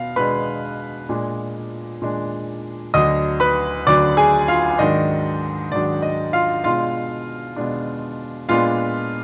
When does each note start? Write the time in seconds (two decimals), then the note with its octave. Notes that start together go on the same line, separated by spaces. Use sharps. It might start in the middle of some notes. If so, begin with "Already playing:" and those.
Already playing: B2 B3 F5
0.16 B2 G#3 B3 D4 B4 B5
1.09 A#2 G#3 D4
2.02 A#2 G#3 D4
2.94 D2 D3 F#3 D4 D#5 D#6
3.40 B4 B5
3.86 D2 D3 F#3 D4 D5 D6
4.17 G#4 G#5
4.48 F4 F5
4.79 G#2 D#3 F#3 D4 D#5
5.72 G#2 D#3 F#3 D4 D5
6.02 D#5
6.33 F4 F5
6.64 B2 G#3 D4 F4 F5
7.56 B2 G#3 D4
8.49 A#2 G#3 B3 D4 F4 F5